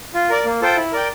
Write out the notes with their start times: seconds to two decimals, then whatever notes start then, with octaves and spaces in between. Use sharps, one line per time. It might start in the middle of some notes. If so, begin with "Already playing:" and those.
0.14 F4
0.30 A#4 D5
0.45 A#3
0.61 F4 A4 C5 G5
0.76 E4
0.92 A#4 D5 G5